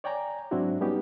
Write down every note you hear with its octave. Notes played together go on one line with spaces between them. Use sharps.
C#5 D5 G5 G#5 A#5
G#2 F#3 C4 D4 E4 F#4
G3 B3 C#4 D#4 G4